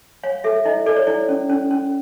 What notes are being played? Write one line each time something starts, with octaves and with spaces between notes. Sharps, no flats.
C#5 F5
A4 E5
E4 D#5
A4 D5
C#5
E4 D5
C#4
C#4
C#4